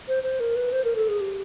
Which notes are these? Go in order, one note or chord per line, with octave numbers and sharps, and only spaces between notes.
C5
C5
A#4
B4
C5
A#4
A4
G#4
G4